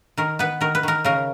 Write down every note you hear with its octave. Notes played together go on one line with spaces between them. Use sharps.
D#3 A#4
B3 B4
D#3 A#4
B4
D#3 A#4
C#3 A#4